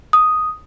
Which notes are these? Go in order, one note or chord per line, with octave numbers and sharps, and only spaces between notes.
D#6